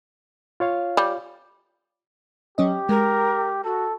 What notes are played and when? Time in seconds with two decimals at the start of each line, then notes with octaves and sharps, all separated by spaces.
0.60 F4 C#5 F5
0.97 G3
2.58 F#3 C#4 G4 D#5
2.89 G#3 A#4
3.64 F#4 A4